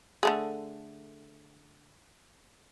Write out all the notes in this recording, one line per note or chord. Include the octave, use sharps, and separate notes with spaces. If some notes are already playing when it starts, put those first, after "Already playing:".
D3 A3 G#4